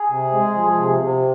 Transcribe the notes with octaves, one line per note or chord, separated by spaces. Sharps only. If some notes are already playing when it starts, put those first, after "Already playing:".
Already playing: G#4
C3
G#3
F3
C3
C3